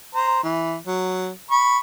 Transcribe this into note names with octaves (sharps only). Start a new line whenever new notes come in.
C5 A#5
E3
F#3
B5 C#6